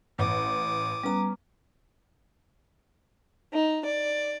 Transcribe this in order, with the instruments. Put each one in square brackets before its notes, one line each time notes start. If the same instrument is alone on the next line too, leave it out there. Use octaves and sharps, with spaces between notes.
[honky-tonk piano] A1 [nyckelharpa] D6 D#6
[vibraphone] G3 A#5 [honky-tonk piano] B3 C#4
[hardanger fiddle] D#4
D5